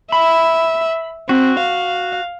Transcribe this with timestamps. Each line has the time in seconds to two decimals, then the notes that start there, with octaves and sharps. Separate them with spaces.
0.12 E5 B5
1.29 C4 F#4
1.60 F5